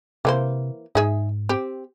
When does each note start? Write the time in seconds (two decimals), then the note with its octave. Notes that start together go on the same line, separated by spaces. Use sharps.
0.25 C3 E3 A#3 C5
0.95 G#2 D#4 G#4 E5
1.49 C4 G4